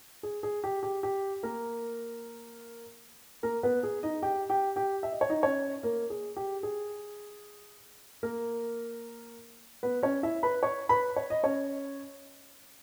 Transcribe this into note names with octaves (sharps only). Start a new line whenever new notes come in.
G#4
G#4
G4
G4
G4
A#3 A#4
A#3 A#4
B3 B4
G#4
D#4 D#5
G4 G5
G4 G5
G4 G5
E5
D#5
C#5
D#4 D#5
C#4 C#5
A#3 A#4
G#4
G4
G#4
A#3 A#4
B3 B4
C#4 C#5
E4 E5
B4 B5
C#5 C#6
B4 B5
C#5
D#5
C#4 C#5